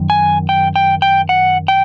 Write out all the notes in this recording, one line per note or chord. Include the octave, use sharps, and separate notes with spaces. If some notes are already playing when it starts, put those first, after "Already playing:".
Already playing: F#2 D#3
G#5
G5
G5
G5
F#5
G5